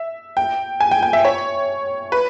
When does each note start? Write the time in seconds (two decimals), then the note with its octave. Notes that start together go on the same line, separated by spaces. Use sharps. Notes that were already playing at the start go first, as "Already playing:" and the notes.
Already playing: E5
0.37 G5
0.80 G#5
0.91 G5
1.03 G5
1.13 E5
1.25 C#5
2.12 B4